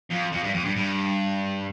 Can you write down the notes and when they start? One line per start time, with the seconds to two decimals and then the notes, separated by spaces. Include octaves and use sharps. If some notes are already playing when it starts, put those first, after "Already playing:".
0.11 F2
0.32 F2
0.44 G2
0.54 F2
0.65 G2
0.76 G2